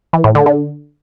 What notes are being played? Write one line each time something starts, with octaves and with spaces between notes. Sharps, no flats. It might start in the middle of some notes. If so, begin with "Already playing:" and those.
E3
A2
D3
D3